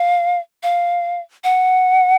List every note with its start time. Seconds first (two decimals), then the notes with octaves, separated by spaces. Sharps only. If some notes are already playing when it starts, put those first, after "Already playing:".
Already playing: F5
0.63 F5
1.44 F#5